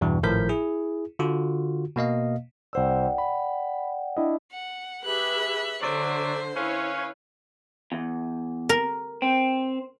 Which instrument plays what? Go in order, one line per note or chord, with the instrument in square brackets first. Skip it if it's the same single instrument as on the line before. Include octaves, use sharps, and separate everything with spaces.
[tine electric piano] E2 G2 B2 E3
G#1 A2 F3 A#4 G6 B6
E4 G#4
D3 F4 F#4
B2 A#3 D#5 F5
[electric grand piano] C2 C5 E6 [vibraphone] D5 F#5 G5
[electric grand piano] B5
D4 E4 D#5
[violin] F#5
[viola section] G4 G#4 B4 [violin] E5 F#6
[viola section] D3 [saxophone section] F#3 D5 E5 [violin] C5
[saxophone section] C#4 B4 F5 [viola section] E4 C#5
[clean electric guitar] E2
[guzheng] A#4
[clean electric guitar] C4